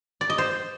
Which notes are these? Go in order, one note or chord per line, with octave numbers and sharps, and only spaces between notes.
D5
D#5
C5